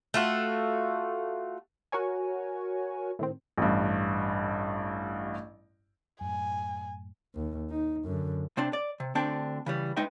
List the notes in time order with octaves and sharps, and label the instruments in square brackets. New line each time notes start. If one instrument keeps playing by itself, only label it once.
[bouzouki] A3 F4 F#4
[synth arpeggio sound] F#4 A#4 C#5 G#5
A2 D#3 C4
[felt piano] A1 G2
[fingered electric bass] F#2 A2 [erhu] G#5
[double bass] D#2
D#4
F#2 D3
[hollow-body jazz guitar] C3 C4 D4
D5
C3
D2 D3 C4 D4 G5 A5
C#3 E3 G3
G#3 D#4 B4 D#5 E5 G5